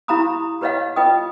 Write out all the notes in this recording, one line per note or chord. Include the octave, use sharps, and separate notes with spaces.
E4 G4 F5 A#5 B5 D#6
G4 B4 C#5 D#5 F5 F#5
F4 B4 D#5 G5 D#6